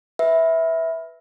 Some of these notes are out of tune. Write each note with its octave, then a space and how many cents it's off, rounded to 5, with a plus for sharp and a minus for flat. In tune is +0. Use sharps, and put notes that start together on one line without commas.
B4 +0 E5 -10